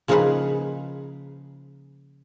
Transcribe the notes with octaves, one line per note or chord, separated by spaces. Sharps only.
C#3 F3 A#3 D#4 G#4 B4